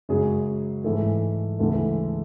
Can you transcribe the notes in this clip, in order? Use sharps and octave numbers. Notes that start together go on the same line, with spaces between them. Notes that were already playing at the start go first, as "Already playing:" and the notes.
F#2 C#3 F#3 G#3 G#4
G#2 E3 G#3 A3 A4
D2 C#3 E3 G#3 A3 A4